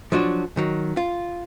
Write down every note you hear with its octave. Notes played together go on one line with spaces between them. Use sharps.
F3 F#3 D4 F#4
D#3 F#3
F4